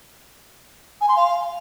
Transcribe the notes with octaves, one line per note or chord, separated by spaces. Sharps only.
G#5
C6
F5